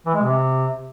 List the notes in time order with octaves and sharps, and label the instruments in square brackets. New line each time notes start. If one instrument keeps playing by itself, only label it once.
[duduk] E3
G#3
C3